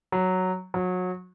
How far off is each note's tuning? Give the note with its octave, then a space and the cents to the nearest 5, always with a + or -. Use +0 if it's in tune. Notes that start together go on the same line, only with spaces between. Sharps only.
F#3 +0
F#3 -25